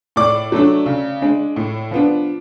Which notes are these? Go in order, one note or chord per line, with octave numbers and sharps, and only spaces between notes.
A2 D5 D6
F#3 A3 D4
C#3
G#3 D4
A2
F3 B3 D4